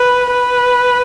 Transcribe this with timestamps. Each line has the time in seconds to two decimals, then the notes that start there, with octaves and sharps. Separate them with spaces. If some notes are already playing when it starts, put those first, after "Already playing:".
Already playing: B4
0.31 B4